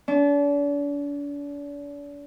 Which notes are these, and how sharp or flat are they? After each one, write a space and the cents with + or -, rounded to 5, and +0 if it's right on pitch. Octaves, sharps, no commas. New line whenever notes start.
D4 -40